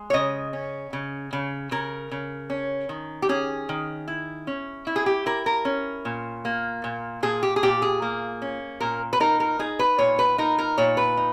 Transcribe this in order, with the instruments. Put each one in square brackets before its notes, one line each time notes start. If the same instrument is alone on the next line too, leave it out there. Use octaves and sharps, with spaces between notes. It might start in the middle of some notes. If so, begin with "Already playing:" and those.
Already playing: [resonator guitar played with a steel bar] G#3
C#5
C#3 D#5
C#4
C#3
C#3
C#3 A#4
C#3
C#4
D#3
G4
C#4 G#4
D#3
E4
C#4
E4
G#4
G4
E4 A#4
A#4
C#4
A#2
A#3
A#2
A#2 G#4
G4
G#4
A#2 G4
G#4
A#3
C#4
A#2 A#4
B4
D#4 A#4
A#4
D#4 G#4
B4
A#2 C#5
B4
D#4 A#4
A#4
A#2 C#5
B4
D#4